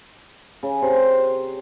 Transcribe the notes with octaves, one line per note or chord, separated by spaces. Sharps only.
C#3
C3 C5